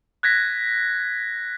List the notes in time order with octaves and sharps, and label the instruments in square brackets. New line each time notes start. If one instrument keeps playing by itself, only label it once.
[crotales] F#6 G#6 A#6 B6